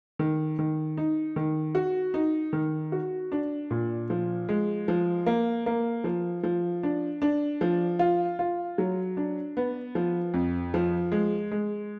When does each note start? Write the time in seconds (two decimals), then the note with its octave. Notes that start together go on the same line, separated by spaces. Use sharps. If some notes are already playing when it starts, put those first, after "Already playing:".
0.19 D#3
0.59 D#3
0.97 D#4
1.36 D#3
1.75 F#4
2.14 D#4
2.53 D#3
2.92 F#4
3.32 D4
3.71 A#2
4.10 F3
4.49 G#3
4.88 F3
5.26 A#3
5.66 A#3
6.04 F3
6.43 F3
6.83 D4
7.22 D4
7.61 F3
7.99 F4
8.39 F4
8.78 F#3
9.17 D4
9.57 B3
9.95 F3
10.34 F2
10.74 F3
11.12 G#3
11.52 G#3